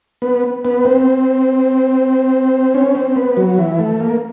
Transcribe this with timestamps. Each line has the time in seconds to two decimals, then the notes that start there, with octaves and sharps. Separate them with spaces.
0.22 B3
0.65 B3
0.85 C4
2.74 C#4
2.95 C4
3.16 B3
3.37 F#3
3.58 E3
3.79 A3
4.01 A#3